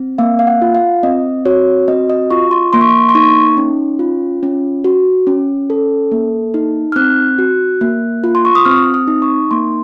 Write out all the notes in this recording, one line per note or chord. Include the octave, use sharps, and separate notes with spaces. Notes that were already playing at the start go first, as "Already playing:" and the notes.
Already playing: C4
A#3 F5
F5
F#5
F4
F5
C4 D#5
F#4 C#5
C4 D#5
D#5
F4 C#6
C6
A#3 C6
C#6
C6
C6
D#4 C#6
C#4
F4
C#4
F#4
C#4
A4
A#3
D#4
F6
C4 F#6
F#4
A#3
F4
C6
C#6
D#6
C4 F6
D#6
D#4
C#6
A#3 C6